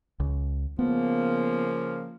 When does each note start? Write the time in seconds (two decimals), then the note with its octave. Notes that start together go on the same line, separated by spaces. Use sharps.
0.20 C#2
0.79 C#3 F3 A#3 B3